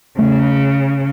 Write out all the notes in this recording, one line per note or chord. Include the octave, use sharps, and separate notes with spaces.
C#3 A3